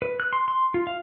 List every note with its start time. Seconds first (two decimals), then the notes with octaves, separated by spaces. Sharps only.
0.02 B4
0.20 F#6
0.33 C6
0.48 C6
0.74 F4
0.87 F5